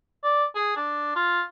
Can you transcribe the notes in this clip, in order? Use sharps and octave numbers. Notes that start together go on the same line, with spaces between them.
D5
G#4
D4
F4